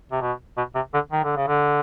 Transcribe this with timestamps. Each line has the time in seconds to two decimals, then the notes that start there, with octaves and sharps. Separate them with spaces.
0.12 C3
0.21 B2
0.57 B2
0.75 C3
0.94 D3
1.12 D#3
1.24 D3
1.36 C#3
1.48 D3